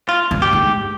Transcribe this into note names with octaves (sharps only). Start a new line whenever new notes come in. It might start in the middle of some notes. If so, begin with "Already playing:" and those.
F4
G2
G4
G#2